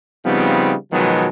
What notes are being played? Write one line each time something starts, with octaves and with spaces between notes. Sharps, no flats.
C#3 F3 G3 B3 C4 D#4
B2 D#3 F3 F#3 G#3 B3